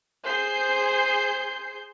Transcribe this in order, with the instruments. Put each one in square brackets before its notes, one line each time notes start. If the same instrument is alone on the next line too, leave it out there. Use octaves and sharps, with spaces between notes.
[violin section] G#4 C5 G6 C7